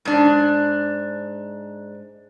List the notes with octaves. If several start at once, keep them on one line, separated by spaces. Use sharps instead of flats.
G#2 D4